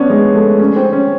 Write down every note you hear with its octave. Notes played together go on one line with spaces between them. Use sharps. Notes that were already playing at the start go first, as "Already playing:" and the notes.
Already playing: B3 C#4 D4
G#3
A3
C#4
C4
C#4